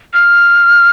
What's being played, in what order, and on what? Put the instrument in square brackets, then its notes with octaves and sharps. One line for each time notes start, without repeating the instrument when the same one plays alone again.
[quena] F6